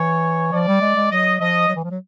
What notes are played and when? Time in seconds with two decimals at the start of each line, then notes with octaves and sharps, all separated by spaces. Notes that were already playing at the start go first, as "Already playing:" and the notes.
Already playing: E3 C#5
0.52 F3 D5
0.68 G3
0.81 G#3
0.96 G#3
1.11 F#3 D#5
1.40 F3 D#5
1.68 F#3
1.76 E3
1.84 F3
1.91 F#3